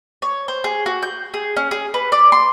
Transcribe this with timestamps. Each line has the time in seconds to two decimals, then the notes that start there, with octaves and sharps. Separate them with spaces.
0.22 C#5
0.48 C5
0.64 G#4
0.86 F#4
1.03 G6
1.34 G#4
1.57 C#4
1.71 G#4
1.94 B4
2.12 D5
2.32 C6